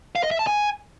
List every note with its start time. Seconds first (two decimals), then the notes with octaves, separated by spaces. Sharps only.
0.16 F5
0.23 D#5
0.31 E5
0.39 A5
0.47 G#5